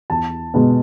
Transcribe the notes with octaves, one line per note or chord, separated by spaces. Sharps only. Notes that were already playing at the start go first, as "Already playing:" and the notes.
E2 A5
B2 G#3 B3